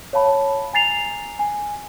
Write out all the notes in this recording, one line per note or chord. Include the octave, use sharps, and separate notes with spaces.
C#5 F5 A5 B5
G#5 A#5 A6 C7 F7
G#5